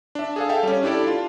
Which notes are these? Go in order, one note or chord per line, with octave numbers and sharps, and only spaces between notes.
D4 E5
G#4 A4 F5
A4 E5 F5 G5
G3 C#4
D4 E4 G4 A4 D5
D4 F4